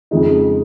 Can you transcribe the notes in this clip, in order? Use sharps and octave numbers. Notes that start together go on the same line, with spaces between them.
F2 C#3 F3 G#3 D#4